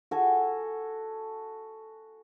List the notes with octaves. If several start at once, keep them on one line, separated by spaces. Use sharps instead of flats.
F#4 A4 G#5